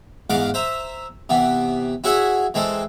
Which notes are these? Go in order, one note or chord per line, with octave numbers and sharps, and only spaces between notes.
E2 G#2 F5 F#5 D6
C5 E5 A#5
C3 E3 B3
E4 F#4 G#4 C#5 E5 F#5
E3 G#3 C4 A4